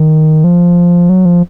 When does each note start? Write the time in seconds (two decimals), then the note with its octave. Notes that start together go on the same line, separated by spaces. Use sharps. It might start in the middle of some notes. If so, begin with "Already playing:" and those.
Already playing: D#3
0.44 F3
1.09 F#3
1.25 F3